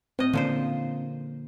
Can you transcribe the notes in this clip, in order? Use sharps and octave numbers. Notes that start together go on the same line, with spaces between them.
A2 C4 D#5
A#2 D3 F3 A#3 C#4 C5